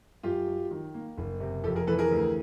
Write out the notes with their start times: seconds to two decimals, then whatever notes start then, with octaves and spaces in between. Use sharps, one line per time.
0.23 F#2 F4 G4
0.47 F#3
0.71 D#3
0.94 A#3
1.18 F#1
1.40 C3
1.64 F2 G4 A4
1.76 G#4 A#4
1.87 E3 A4 B4
1.99 G#4 A#4
2.11 D2